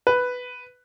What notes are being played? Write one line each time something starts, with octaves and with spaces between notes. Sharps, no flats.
B4